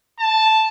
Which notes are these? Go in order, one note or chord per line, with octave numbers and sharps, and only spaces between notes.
A5